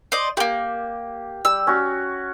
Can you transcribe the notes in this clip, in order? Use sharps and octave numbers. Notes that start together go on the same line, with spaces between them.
C5 D5 D#5
A3 A#3 G4
G3 E6
C#4 F#4